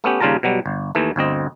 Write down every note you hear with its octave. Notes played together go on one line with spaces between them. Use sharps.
A3 B3 C#4 G4
D#2 C#3 G3 F4 A5 A#5
B2 F#3 G3
G1
D#2 E3 A3
G1 D2 C4 D#5